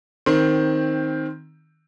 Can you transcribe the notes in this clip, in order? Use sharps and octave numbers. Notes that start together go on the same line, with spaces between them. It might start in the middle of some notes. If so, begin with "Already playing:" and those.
D#3 C4